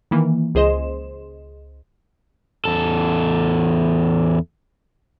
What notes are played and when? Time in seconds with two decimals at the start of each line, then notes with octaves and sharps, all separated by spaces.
0.11 D#3 E3 A#3
0.55 C#2 G#4 C5 D#5 C6 E7
2.65 E2 A4